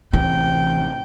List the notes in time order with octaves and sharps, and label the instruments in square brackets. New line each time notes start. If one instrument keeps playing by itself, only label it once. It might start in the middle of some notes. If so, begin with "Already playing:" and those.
[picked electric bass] A1 C3 [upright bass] E3 [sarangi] G5